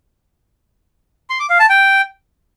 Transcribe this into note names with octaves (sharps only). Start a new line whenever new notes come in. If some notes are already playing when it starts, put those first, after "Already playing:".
C6
D6
F5
A5
G5